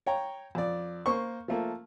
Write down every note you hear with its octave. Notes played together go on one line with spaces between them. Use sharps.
C#5 G5 A#5
F2 D5
A#3 C5 C#6
F3 A3 A#3